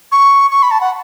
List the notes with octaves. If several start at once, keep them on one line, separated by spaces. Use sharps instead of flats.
C#6
C#6
B5
A5
F#5